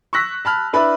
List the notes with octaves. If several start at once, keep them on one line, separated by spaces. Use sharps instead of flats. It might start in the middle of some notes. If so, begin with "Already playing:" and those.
C#6 E6 F#6 A#6 B6
A5 B5 F6
D4 E4 B4 D5 E5 B5